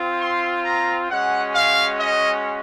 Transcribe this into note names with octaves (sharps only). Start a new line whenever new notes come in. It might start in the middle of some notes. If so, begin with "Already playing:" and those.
Already playing: C4 F4
C6
A#5
G#3 C#4 F#4 F#5
F5
D#5